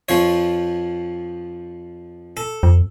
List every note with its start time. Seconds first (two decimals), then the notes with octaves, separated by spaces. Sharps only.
0.09 F2 F3 C#5
2.37 A4
2.63 F2